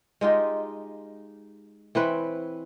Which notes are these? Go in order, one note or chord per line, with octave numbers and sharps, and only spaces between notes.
G#3 D#4 F4 G4
E3 C4 B4 C#5